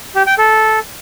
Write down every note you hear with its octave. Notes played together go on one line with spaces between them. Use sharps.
G4
G5
A4